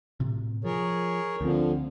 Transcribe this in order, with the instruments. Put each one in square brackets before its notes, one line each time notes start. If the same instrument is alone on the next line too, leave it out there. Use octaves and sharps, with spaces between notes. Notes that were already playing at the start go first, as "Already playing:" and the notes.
[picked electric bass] A2 C3
[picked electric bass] F3 [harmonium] G#4 A#4 C#5
[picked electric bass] D2 C4 [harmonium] D3 F3